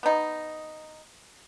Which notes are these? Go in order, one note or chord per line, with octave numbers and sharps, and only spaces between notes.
B3 D#4